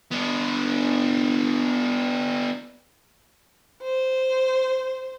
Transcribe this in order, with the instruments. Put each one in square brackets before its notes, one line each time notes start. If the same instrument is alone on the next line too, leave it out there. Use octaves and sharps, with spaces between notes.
[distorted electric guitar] B3 D4
[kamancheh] C5